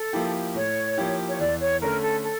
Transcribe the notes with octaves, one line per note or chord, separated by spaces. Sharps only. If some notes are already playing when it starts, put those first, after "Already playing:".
Already playing: A4
F3 A#3 E4 G4
A2 C#5
F3 A#3 E4 G4
C#5
E2 D5
C#5
D3 A3 C#4 A#4
A4
A4